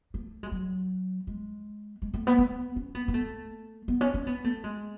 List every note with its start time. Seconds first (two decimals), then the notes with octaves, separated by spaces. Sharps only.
0.14 A3
0.43 G#3
0.52 F#3
1.27 G#3
2.02 G#3
2.14 A3
2.27 B3
2.38 B3
2.76 C#4
2.95 B3
3.08 B3
3.14 A3
3.88 B3
4.01 C#4
4.14 C#4
4.27 B3
4.44 A3
4.64 G#3